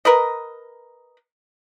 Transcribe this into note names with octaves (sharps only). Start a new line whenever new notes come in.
A#4 B4 D#5